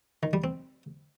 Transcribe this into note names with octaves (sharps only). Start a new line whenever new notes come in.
D#3
G3
C4